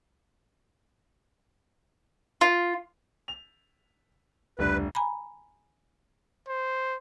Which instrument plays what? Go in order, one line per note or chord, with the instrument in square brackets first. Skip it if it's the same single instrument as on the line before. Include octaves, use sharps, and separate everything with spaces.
[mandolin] F4
[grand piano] F7
[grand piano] F1 [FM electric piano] C#2 G3 D4 [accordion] B4
[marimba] G#5 A#5 B5
[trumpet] C5